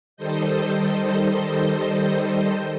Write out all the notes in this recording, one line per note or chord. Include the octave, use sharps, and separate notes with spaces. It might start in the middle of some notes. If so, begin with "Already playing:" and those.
D#3 G3 A4 C5 D#5 G6